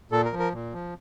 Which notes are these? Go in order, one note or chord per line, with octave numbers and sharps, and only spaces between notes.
A#2 A4
A#4
F3
A#4
A#2
F3